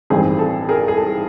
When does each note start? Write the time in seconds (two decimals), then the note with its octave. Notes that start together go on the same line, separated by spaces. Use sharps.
0.10 A1 G2 D#3 G3 C4 G#4
0.39 A4
0.69 G#4 A#4
0.88 G#4
0.97 A4